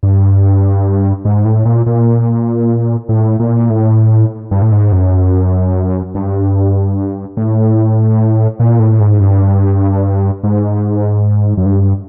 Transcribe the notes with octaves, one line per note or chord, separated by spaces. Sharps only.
G2
G#2
A2
A#2
A#2
A2
A#2
A2
G2
A2
G#2
F#2
G2
A2
A#2
A2
G#2
G2
G#2
F#2
G2